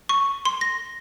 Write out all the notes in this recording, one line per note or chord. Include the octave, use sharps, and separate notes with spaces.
C#6
C6
A#6